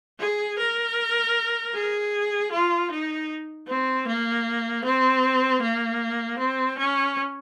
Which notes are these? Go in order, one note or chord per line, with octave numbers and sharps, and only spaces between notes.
G#4
A#4
G#4
F4
D#4
C4
A#3
C4
A#3
C4
C#4